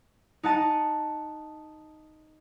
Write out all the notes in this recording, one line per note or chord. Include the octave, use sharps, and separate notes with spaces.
D#4 F#5 A5 D#7